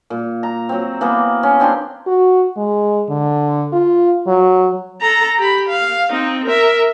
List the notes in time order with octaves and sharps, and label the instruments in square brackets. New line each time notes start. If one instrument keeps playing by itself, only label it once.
[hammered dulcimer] A#2
A#5
F#3 C4
E3 A#3 B3
C#4
C4 D4 G4 C6
[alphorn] F#4
G#3
D3
F4
F#3
[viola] A4 A#5
G4 B5
F5
C4 D#4
A#4 E5